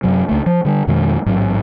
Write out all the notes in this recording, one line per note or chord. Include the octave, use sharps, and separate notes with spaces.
F#2 C3 F#3
C#2 A3
F3
D3 G3
F2 B2 D#3 G#3
A1 G#2 F#3